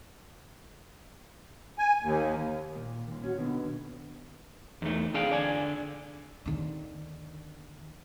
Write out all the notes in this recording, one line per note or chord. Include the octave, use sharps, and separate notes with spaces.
G#5
D#2
A#2
D#2 A#2
C#4 F#4
B2 D3 D#3 B3
E2 D#3 A3
C4 D4 G#4 F5 G5
D3 D5 G#5
D#2 D3